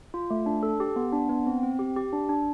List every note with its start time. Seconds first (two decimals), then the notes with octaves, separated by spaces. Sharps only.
0.14 F4
0.30 A3
0.46 D4
0.63 A4
0.80 G4
0.96 B3
1.12 D4
1.29 B3
1.46 C4
1.63 C4
1.79 G4
1.96 G4
2.13 D4
2.29 D4